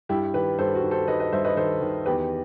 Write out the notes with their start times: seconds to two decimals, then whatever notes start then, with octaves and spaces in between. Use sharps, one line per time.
0.09 G2 E4 G4
0.34 D#3 G4 B4
0.59 G2 A4 C5
0.75 F#4
0.83 D#3
0.91 A4 C5
1.08 D#3 B4 D#5
1.20 B4 D#5
1.32 G2 C5 E5
1.45 B4 D#5
1.57 D#3 A4 C5
1.81 D#3
2.06 E2 G4 B4